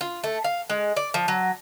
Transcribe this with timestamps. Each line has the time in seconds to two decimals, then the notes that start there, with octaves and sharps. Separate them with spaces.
0.01 F4
0.24 A3
0.44 F5
0.70 G#3
0.96 D5
1.14 F3
1.28 F#3